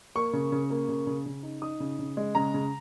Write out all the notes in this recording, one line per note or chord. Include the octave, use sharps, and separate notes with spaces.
A#3 C#6
C#3
C#3
A#3
C#3
C#3
C#3
D#4
D#4 D#6
C#3
C#3
G#3
C#3 A#5
C#3